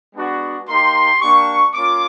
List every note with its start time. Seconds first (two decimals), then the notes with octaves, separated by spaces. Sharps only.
0.15 G#3 B3 D4 F#4
0.68 A#3 D#4 G4 C6
1.21 A#3 D4 G4 C#6
1.74 A#3 C#4 F4 D6